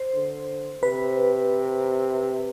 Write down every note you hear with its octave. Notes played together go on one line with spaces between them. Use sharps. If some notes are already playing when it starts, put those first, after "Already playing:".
Already playing: C5
D3
C3 B4